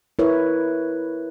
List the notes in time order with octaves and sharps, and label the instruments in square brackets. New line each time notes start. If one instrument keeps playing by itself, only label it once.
[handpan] E4 A#4 B4 C#5